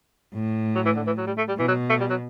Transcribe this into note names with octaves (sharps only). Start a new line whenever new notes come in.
A2
F#3
E3
D3
E3
F#3
G3
A3
G3
B2 E3
F#3
A3
G3
F#3